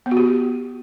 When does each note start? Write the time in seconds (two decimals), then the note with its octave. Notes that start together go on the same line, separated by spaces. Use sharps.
0.06 B3
0.11 F#4
0.17 G4